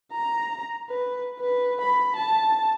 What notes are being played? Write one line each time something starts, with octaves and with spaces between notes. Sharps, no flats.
A#5
B4
B4
B5
A5